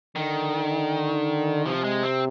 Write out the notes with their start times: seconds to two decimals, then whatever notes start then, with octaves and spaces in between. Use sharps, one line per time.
0.16 D3 D#3
1.66 C3 F3
1.84 G#3
2.03 C4